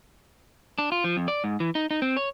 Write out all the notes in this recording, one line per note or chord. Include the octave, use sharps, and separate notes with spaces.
D4
F4
F3
F2
D5
G#2
E3
D#4
D#4
C4
C#5